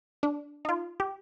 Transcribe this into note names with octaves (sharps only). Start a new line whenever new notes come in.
D4
D#4
F4
G4